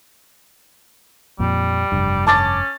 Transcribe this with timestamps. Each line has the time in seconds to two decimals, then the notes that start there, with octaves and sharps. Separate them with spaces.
1.40 F2 A#2 G3
1.92 F1 G2
2.27 C#4 A5 D6 A6